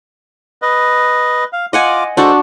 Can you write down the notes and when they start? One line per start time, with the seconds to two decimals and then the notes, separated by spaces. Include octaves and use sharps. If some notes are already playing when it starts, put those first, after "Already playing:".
0.62 B4 D#5
1.53 F5
1.73 F4 D#5 F#5 G#5 D6
2.17 G#3 D4 F#4 A4 C5 A5